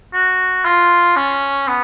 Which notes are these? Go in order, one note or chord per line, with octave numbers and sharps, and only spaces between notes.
F#4
F4
C#4
B3